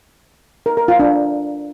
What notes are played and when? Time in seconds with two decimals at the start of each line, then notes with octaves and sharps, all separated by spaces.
0.66 A#4
0.77 A#4
0.88 F4
0.99 D4